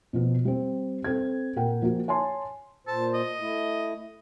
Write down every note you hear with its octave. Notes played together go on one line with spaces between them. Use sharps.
B2 F3 B3
G3 C4
C4 A4 G#6
A#2 A#4 F#5 G5
F3 A#3 F#4
C#5 G#5 A5 C6
A#2 C5 A5
D#5
A3 E4